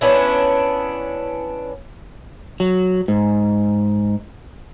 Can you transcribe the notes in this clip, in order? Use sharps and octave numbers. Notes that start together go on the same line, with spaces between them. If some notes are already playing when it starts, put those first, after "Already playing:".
B3 C#4 D4 E4
F#3
G#2